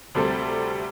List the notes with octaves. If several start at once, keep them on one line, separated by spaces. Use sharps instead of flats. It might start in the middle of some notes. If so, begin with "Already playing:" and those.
D2 C3 G3 A3 A4 C5